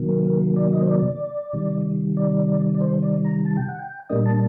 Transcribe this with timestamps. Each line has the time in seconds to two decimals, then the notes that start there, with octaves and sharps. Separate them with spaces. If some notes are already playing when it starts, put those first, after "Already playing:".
Already playing: C3 D#3 F#3 A#3
0.08 A#4
0.25 A#4
0.56 D5
0.73 D#5
0.82 C5
0.88 D5
1.53 C3 D#3 G3
2.17 D5
2.75 D5
2.81 C5
3.02 D5
3.24 A#5
3.45 A5
3.57 G5
3.69 F#5
3.79 G5
4.10 A#2 G3 A#3 D4 D#5
4.26 A5